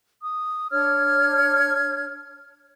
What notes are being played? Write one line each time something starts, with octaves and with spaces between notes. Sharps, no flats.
D#6
D4 C#5 F6 G#6